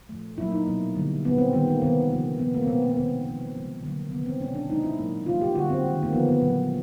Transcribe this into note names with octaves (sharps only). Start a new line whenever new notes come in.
A#2 F3 A3
A#2 F#3 A#3 E4
D#4
B2 F#3 A#3
D3 G3 A#3
A#2 G3 A#3 B3
C4
D#3 G3 A#3 B3
A#3
C3 D#3 G3 B3
C3 F3 A#3
A#2 F3 A#3 B3
A#3
C4
B2 G#3 B3
A#3
B3
C3 D#3 G3 A#3 C4
C#3 F3 A3
C#3 F3 G#3
D3 F#3 A#3
C3 D#3 G3 B3
C4
B2 G#3 C#4
D4
B2 G#3 D#4
E4
A#2 F#3 A#3
C#3 E3 G3 A#3 F4
G4
D3 G3 A#3 F#4
C4
D#3 G#3
A#3
D3 F3 A3 B3
B3
A#2 F#3 A#3